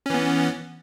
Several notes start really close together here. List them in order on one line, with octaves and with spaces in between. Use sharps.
C#4 E3 B3